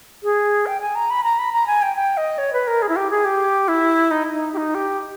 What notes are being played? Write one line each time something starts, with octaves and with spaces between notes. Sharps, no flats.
G#4
G5
G#5
A#5
B5
A#5
B5
A#5
G#5
G5
G5
D#5
C#5
B4
A#4
G#4
E4
G4
G#4
G4
E4
D#4
D#4
G4
D#4
G4